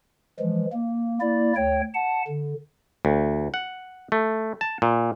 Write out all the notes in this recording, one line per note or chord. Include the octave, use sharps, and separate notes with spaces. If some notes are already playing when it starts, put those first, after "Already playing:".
E3 F3 G#3
A#3
A#3 E4 D5
D2 C#5 G5
F#5 A5
D3
D2
F#5
A3
A5
A#2